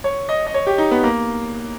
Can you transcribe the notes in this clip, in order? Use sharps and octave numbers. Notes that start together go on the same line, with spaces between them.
C#5
D#5
D#5
C#5
G4
D#4
B3
A#3